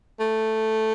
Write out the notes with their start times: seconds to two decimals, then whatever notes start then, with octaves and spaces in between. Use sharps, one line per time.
0.20 A3